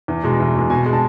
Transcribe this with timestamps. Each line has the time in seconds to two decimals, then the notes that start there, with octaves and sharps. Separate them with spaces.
0.08 E2
0.23 B2 G#3
0.40 E2
0.55 B2 G#3
0.70 B2 G#5
0.86 G#3
0.93 A5